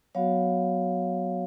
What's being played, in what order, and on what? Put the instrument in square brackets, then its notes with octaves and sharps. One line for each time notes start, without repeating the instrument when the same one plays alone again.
[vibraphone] F#3 B3 F#4 C#5 F5